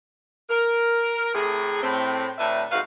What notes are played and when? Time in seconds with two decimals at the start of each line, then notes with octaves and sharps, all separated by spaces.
0.49 A#4
1.34 A2 C3 A3 G#4
1.83 A2 C4
2.38 D2 A2 D4 B4 E5
2.71 F2 G#2 F#4 B4 E5 F5